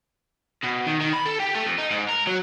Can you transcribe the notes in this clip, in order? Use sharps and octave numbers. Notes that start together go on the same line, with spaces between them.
B2
D#3
D#3
B5
A4
G4
A3
F2
D#4
G#2
A#4
F#3